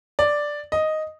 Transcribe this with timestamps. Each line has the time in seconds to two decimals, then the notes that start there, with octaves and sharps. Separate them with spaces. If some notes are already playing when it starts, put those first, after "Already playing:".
0.19 D5
0.72 D#5